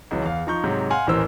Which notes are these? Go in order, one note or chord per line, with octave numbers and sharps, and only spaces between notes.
C#2 E3 F#3
E2 F5
F3 D#4 A#5 C#6 G6
G#2 C3 F#3
F5 F#5 G#5 C6 F6
D#1 A1 E3 A#4 C5 E6